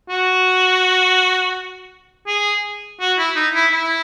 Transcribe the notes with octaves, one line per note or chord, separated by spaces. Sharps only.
F#4
G#4
F#4
E4
D#4
E4
E4